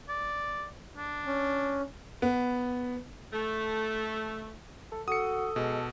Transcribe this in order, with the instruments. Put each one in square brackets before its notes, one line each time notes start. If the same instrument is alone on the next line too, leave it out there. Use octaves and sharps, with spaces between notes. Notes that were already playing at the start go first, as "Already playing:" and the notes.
[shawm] D5
D4
[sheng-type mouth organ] C#4
[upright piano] B3
[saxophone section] A3
[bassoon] A4
[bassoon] F#4 [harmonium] A4 [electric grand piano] D#6 C#7
[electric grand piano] B2 [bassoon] G#3